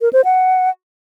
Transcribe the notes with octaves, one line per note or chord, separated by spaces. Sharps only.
A#4
C5
F#5